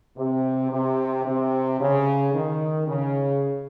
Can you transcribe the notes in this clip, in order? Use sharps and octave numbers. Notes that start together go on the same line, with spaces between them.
C3
C3
C3
C#3
D#3
C#3